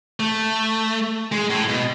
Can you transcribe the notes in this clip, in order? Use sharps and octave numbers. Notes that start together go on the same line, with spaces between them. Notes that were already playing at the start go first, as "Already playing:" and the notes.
A3
G#3
A2
B2